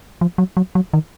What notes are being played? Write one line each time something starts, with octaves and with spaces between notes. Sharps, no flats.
F3
F#3
F#3
F#3
D#3